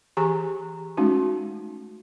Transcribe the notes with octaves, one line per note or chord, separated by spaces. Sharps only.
E3 G4 G#4 G#5 A#5 C#6
G#3 A3 C#4 D#4 F#4